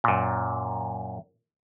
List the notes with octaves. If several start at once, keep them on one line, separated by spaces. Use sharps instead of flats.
F#2 A#2